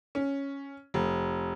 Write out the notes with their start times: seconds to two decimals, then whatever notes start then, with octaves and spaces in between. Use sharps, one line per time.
0.15 C#4
0.94 F1